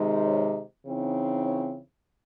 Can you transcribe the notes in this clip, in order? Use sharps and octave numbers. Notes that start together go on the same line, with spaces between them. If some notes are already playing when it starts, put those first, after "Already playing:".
Already playing: C3 D#3 G#3 D#4
C#5
C#3 E3 C4 D#4
C#5